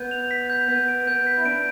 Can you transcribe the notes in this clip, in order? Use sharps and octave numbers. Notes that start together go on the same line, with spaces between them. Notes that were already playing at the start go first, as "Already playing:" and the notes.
Already playing: B3 G6
F7
B6
G6
B3 B6
D7
B3 G6
B6
E4
D4 D7